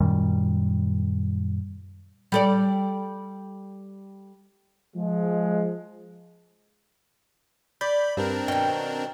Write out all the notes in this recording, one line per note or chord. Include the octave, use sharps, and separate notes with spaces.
F#2 A#2 D#3 G3
G3 A4 D5
F3 G#3
D5 B5 G6
G2 C4 D4 A#4
B2 D#3 G5